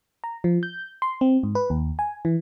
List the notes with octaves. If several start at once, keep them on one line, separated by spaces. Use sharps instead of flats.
A#5
F3
G6
C6
C4
G#2
B4
D#2
G#5
E3